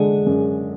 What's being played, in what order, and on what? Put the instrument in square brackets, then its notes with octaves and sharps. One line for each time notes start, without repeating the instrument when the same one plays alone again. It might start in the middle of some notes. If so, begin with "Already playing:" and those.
Already playing: [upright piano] D3 G#3 D4 [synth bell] G#4
[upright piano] F#2